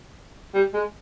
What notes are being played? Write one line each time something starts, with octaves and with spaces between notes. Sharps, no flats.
G3
G#3